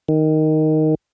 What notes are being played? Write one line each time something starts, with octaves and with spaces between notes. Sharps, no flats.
D#3